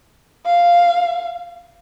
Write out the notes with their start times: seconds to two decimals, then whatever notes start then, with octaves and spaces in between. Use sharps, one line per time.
0.46 F5